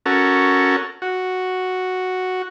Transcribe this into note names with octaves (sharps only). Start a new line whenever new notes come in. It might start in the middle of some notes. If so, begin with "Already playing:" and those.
C#4 F#4 A4 A#4
F#4